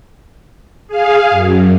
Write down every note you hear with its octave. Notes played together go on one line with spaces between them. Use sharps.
G#4 F5
F#2